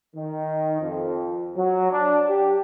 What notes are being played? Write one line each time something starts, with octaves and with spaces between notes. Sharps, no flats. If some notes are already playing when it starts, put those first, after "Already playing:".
D#3
F2
F#3
D4
G4